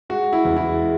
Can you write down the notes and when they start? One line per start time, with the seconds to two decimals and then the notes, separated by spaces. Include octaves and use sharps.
0.09 G#3 F#4
0.33 E4
0.45 E2
0.56 E4
0.81 G#3